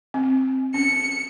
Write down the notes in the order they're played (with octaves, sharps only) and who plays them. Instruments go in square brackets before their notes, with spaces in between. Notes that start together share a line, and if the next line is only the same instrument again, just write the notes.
[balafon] C4
[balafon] C#4 [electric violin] C#7